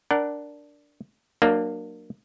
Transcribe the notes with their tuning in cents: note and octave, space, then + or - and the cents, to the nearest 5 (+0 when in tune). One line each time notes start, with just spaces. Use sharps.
D4 +0 A#4 +0 F#5 +20
F#3 +0 A#3 +0 D4 +35